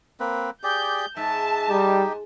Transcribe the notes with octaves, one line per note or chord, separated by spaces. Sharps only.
A#3 C4 B4
G4 G#4 D5 G6
G#2 E5 A5
G3 D#4 G4